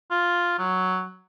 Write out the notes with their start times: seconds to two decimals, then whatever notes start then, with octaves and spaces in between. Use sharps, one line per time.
0.11 F4
0.59 F#3